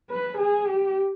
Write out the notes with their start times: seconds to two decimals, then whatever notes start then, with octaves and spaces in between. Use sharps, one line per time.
0.10 B4
0.38 G#4
0.67 G4